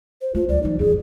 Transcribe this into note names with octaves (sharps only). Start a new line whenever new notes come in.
C5
A3 F4
D2 F#3 D5
E3 F#3 D#4
D1 F2 G#4